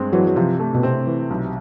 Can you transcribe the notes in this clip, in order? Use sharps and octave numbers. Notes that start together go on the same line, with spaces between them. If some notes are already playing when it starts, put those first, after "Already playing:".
Already playing: G2 G#3 C4
E3 F#3
F#3
C3 F3
A3
B2
C3 C4
E3
B1